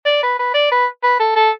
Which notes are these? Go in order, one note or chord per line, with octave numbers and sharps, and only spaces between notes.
D5
B4
B4
D5
B4
B4
A4
A4